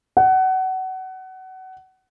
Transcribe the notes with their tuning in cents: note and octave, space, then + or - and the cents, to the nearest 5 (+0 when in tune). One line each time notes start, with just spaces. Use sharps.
F#5 +25